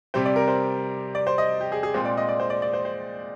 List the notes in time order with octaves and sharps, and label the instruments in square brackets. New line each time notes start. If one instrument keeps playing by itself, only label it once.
[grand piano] C3 G3 C4 C5
D5
A#4
C5
D5
C5
D#5
G4
G#4
G#4
A#2 G#3 C4 C5
D5
D#5
D5
C5
D5
D5
C5
C5